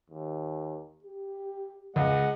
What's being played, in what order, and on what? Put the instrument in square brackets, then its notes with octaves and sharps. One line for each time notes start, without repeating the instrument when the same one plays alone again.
[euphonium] D#2
G4
[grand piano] C#2 [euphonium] G#3 [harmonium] D#5 F#5